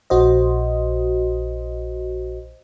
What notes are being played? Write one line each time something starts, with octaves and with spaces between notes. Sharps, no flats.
A#1 F#4 C5 D#5